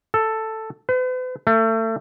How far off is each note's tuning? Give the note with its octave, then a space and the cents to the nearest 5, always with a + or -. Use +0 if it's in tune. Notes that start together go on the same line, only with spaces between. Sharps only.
A4 +5
B4 +45
A3 +30